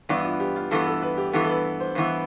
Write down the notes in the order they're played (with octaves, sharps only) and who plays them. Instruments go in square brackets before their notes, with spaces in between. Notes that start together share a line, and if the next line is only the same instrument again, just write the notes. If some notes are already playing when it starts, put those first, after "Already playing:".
[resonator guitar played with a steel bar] G2 E3 B3 [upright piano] D4
[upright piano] F4
G4
F4
[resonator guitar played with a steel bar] G2 E3 B3 [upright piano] A4
[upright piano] A4
B4
G4
[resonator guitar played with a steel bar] G2 E3 B3 [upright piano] A4
[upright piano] A4
B4
C5
[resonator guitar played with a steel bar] G2 E3 B3